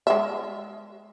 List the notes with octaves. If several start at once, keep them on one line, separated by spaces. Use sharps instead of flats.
G#3 E5